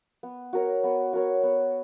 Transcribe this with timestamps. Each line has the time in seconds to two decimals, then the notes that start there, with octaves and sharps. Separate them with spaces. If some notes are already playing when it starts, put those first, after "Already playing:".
0.23 B3
0.53 F#4 A#4 C#5
0.84 B3
1.13 F#4 A#4 C#5
1.43 B3